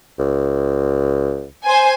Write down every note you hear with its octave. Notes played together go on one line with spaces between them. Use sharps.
C#2
C5 G#5